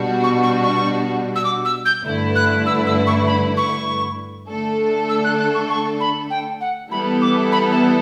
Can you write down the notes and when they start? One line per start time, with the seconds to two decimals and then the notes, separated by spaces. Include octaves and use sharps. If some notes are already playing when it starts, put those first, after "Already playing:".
Already playing: B2 G3 D4 F#4
0.24 C#6
0.43 C#6
0.63 C#6
1.35 E6
1.44 D6
1.65 E6
1.85 G6
2.05 G2 D3 A3 E4 B4
2.35 F#6
2.66 E6
2.86 E6
3.07 C#6
3.27 B5
3.57 C#6
4.48 D3 A3 D4 A4
5.09 E6
5.24 F#6
5.40 F#6
5.54 C#6
5.70 C#6
6.00 B5
6.30 G5
6.61 F#5
6.91 E3 G3 B3 E4 A4 B5
7.22 D6
7.52 B5
7.72 A5